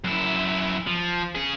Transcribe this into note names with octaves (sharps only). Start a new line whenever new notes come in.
F#2 E4
F3
C#4 G#4